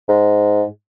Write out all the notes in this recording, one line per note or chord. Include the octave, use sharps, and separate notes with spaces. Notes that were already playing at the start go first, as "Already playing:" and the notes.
G#2